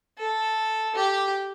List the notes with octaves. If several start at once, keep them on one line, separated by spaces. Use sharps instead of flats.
A4
G4